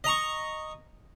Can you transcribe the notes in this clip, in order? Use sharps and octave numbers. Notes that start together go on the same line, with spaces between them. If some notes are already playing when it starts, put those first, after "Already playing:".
D#5 A#5 C#6